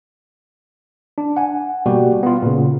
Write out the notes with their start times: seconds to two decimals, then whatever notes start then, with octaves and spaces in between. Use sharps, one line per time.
1.18 D4
1.37 F#5 G#5
1.86 B2 G3 A#3 F#4 G4
2.23 B3 F4
2.42 A#2 C#3